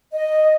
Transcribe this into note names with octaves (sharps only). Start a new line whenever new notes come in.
D#5